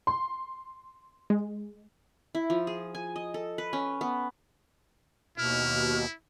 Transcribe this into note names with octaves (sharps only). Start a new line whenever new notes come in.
C6
G#3
E4
F3
G#4
G#5
D#5
A4
B4
C#4
B3
D#2 B2 E4 F6